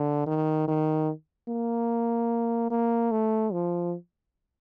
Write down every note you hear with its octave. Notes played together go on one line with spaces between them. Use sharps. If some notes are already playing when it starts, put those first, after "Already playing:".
Already playing: D3
D#3
D#3
A#3
A#3
A3
F3